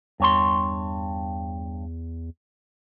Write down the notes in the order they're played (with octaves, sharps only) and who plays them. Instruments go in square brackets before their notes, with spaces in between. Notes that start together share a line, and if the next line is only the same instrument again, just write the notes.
[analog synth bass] E2 [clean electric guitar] G2 C#5 C6